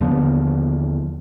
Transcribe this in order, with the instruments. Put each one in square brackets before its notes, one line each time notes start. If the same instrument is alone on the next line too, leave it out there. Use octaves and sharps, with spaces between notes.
[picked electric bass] D#2 D3 F3 B3